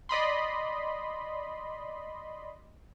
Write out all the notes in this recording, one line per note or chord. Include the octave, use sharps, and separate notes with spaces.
D5 D#5 B5 C6